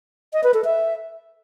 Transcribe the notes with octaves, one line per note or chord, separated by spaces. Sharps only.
D#5
B4
A4
E5